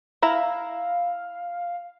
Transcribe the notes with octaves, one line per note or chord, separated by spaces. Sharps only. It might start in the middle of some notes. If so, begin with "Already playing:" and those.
E4 E5 F5 A#5